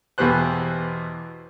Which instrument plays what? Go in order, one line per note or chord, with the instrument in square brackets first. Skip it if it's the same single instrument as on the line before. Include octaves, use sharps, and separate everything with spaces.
[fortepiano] E2 B2 E3 G4 C5 F#6